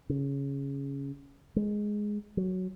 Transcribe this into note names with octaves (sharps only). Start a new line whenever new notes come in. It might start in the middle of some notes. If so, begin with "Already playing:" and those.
C#3
G#3
F#3